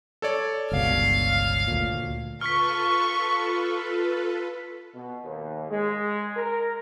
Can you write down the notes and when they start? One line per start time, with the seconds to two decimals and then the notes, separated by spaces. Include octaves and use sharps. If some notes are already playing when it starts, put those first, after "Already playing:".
0.22 A4 C#5 D5
0.72 G1 C#2 B2 F5
1.67 D2 A#2
2.41 F4 A4 B4 C#6 F6 B6
4.95 B2
5.24 D#2
5.70 G#3
6.37 A#4